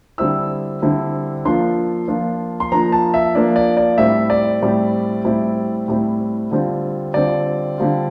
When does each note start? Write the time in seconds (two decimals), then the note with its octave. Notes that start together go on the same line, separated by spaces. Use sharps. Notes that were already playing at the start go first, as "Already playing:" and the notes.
0.18 D3 G3 C4 E4 E6
0.82 D3 G3 C4 E4
1.45 F3 A#3 D4 F4 C6
2.08 F3 A#3 D4 F4
2.60 C6
2.72 F3 A#3 D4 F4 A#5
2.92 A5
3.14 E5
3.34 F3 A#3 D4 F4 D5
3.56 D5
3.77 D5
3.98 A2 G3 C4 E4 E5
4.30 D5
4.61 A2 G3 C4 E4
5.25 A2 G3 C4 E4
5.88 A2 G3 C4 E4
6.51 D3 G3 C4 F4
7.14 D3 G3 C4 F4 D5
7.78 D3 G3 C4 F4